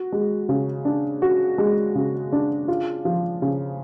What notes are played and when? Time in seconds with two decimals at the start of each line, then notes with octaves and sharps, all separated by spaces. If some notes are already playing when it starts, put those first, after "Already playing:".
Already playing: F#4
0.12 G#3
0.49 C#3
0.85 D4
1.22 F#4
1.58 G#3
1.95 C#3
2.32 D4
2.68 F4
3.05 F3
3.42 C#3